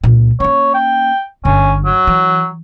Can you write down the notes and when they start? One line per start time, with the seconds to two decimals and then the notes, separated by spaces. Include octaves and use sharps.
0.04 C#2 A#2
0.40 A#3 C#4 C#5
0.74 G5
1.45 G1 D3 C#4
1.85 F#3
2.07 E3